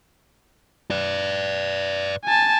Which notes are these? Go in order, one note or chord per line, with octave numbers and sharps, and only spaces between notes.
B4 D5
G#5 A5